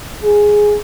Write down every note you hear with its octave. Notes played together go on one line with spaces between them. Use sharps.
G#4